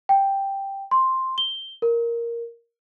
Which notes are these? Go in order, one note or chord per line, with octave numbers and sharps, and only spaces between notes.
G5
C6
G7
A#4